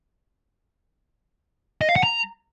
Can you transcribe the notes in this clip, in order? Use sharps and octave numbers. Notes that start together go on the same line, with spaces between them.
D#5
F5
F#5
A#5